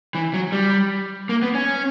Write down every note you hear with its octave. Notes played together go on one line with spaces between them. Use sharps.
E3
F#3
G3
A#3
B3
C#4